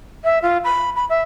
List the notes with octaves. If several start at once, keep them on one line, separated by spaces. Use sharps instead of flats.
E5
F4
B5
B5
E5